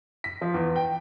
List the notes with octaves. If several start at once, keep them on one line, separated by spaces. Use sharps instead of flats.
B6
F3
E2
G5